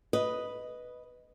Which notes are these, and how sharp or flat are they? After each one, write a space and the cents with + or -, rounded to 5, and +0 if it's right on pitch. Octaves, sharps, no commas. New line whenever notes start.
B4 +0 D#5 +0